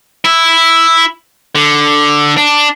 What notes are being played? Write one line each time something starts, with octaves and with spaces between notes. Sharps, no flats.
E4
D3
D4